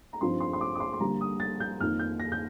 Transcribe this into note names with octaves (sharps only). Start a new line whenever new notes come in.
A#5
G2 F3 C4 D#4 C6
C6
C6
D6
D6
C6
C6
D3 G3 A#3 D4 A#5
D#6
A6
G6
F2 D#3 A#3 D#4 F6
G6
A#6
G6